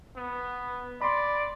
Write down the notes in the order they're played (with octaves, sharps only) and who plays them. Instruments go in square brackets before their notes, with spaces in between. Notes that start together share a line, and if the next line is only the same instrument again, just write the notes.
[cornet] B3
[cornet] D5 [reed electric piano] B5 C6